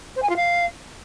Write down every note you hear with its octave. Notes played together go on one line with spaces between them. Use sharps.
C5
G#5
F4
F5